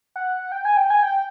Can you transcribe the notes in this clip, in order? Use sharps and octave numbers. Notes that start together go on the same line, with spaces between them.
F#5
G5
G#5
G5
G#5
G5